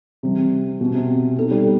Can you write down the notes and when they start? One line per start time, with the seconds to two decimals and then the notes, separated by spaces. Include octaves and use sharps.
0.23 C3 E3 G3 C4
0.81 B2
0.94 C3
1.37 B3 D#4 A4
1.51 G3